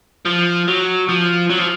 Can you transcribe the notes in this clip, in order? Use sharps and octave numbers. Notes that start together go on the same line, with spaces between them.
F3
F#3
F3
F#3
F3